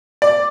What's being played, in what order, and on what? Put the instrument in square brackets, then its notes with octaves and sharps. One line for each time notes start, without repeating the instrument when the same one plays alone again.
[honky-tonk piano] D5